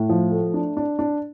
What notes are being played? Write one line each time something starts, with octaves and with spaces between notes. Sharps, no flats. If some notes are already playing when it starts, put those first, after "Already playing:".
Already playing: A2
F3
A3
D4
D4
D4